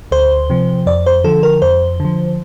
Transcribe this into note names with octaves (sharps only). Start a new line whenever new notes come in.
D2 C5
C3 F3
F2 D5
C5
D3 F3 A4
A#4
F2 C5
D3 F3